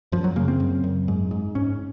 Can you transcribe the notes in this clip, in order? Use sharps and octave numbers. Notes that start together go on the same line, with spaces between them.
F#2 F3
F#3
C#3 A#3
C4
F#2
F#2
G#2
G#2
G#2 C#4